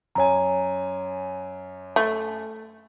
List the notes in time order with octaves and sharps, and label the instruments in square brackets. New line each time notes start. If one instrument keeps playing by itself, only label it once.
[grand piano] F#2 G#5 [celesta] C#5 A#5
[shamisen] A3